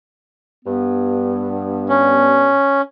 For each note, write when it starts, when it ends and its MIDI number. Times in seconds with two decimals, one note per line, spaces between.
0.65 2.54 43
0.65 2.54 59
1.89 2.81 61